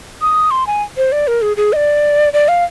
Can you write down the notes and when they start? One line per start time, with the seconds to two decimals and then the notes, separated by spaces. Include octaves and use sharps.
0.22 D#6
0.51 C6
0.67 G#5
0.97 C5
1.12 D5
1.27 A#4
1.42 G#4
1.57 G#4
1.73 D#5
1.76 D5
2.33 D5
2.48 F5